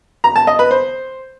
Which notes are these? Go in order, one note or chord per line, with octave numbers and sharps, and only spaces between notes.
A#5
A5
D#5
B4
C5